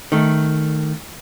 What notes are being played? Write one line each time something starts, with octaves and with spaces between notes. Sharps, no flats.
D#3 A3